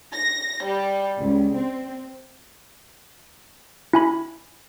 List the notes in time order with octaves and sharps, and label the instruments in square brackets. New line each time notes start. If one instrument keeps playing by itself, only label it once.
[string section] A#6
G3
C#2
C4
[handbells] E4 G#5 B5